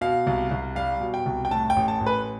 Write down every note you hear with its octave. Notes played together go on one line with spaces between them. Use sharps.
B2 F5
C2
C2
G3 F5
B2
G5
C2
G5
A2 A5
G5
A1
A5
A1
B4